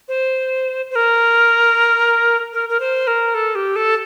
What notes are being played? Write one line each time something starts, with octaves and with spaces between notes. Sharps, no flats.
C5
C5
A#4
A#4
A#4
C5
A#4
A4
G4
A4